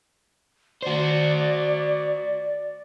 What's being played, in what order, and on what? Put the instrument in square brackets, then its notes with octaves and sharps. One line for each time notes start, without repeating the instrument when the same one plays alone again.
[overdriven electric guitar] F#4 C5 [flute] D5